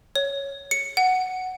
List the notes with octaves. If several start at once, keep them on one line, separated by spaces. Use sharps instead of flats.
C#5
C#7
F#5